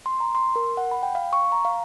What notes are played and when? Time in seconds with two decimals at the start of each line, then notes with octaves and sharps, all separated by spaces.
0.06 C6
0.20 A#5
0.35 C6
0.56 A#4
0.77 F#5
0.91 B5
1.03 G5
1.15 F5
1.33 C#6
1.52 A#5
1.65 F5